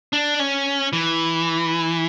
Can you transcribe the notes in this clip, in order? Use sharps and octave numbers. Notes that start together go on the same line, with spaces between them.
D4
C#4
E3